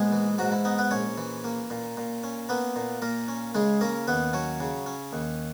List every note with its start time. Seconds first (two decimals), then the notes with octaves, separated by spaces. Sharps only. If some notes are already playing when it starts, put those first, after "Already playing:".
Already playing: A#1 G#3 B3 G#4
0.12 E3
0.38 G#2 F#3 F#4
0.52 E4
0.65 B3 D#4
0.78 B3 B4
0.91 A#1 C#4 C#5
1.18 E3
1.44 A#3
1.70 A#2
1.97 A#2
2.23 C#4
2.49 A#3 B3 B4
2.76 A#2
3.02 A#2 A#3 A#4
3.28 C#4
3.55 C#3 G#3 G#4
3.81 A#3 C#4 A#4
4.07 D#2 B3 B4
4.33 F#3 C#4 C#5
4.60 C#3
4.86 C#4
5.13 D#2